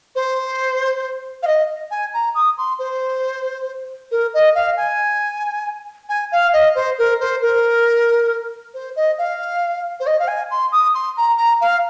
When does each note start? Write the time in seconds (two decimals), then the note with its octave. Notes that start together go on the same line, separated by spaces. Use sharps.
0.15 C5
1.43 F5
1.47 D#5
1.91 G#5
2.14 A#5
2.35 D#6
2.58 C6
2.79 C5
4.11 A#4
4.34 D#5
4.55 F5
4.77 G#5
6.09 G#5
6.32 F5
6.53 D#5
6.75 C5
6.98 A#4
7.20 C5
7.42 A#4
8.74 C5
8.96 D#5
9.18 F5
10.00 C5
10.07 D#5
10.19 F5
10.27 G#5
10.51 C6
10.72 D#6
10.94 C6
11.17 A#5
11.38 A#5
11.61 F5